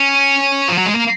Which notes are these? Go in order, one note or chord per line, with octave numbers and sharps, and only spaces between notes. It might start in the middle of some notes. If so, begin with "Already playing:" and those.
Already playing: C#4
F3
F#3
G#3
A#3